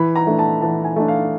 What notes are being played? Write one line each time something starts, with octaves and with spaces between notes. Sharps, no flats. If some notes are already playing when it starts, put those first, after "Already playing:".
Already playing: E3 B5
A#5
A3 D4
A5
E3 A5
G#5
A3 D4
F5